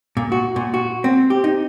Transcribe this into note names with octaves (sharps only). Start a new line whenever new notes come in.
A#2
F#4
A#2
F#4
C4
G4
D#4